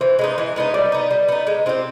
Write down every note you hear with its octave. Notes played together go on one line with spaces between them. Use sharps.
E3 C5
G#3 B3 D#4
E3
G#3 B3 D#4
G3 D5
B3 D#4
G3
B3 D#4
G#3
C4 E4 G4